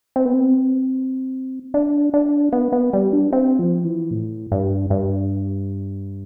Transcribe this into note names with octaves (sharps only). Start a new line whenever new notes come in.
C4
B3
C4
D4
D4
B3
B3
G3
D4
C4
F3
E3
A2
G2
G2